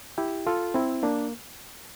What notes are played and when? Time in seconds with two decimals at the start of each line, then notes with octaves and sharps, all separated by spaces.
0.18 E4 G4
0.47 F4 A4
0.74 C4 E4
1.03 A#3 D4